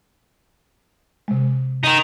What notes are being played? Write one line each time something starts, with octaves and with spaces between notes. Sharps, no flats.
C3 G#3
D#3 D#4